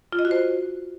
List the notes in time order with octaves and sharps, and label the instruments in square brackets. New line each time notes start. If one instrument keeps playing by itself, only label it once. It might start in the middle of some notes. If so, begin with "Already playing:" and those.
[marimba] F4
D#5
F#4
C5